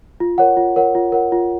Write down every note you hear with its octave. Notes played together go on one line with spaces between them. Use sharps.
F4
A#4 C#5 F#5
F4
A#4 C#5 F#5
F4
A#4 C#5 F#5
F4